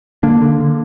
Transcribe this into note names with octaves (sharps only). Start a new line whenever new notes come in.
D3 A#3 D4
D3
D3